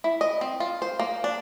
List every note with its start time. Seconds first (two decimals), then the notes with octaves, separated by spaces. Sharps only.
0.04 E4
0.21 D#5
0.41 C4
0.60 F4
0.82 C5
0.99 A#3
1.24 D4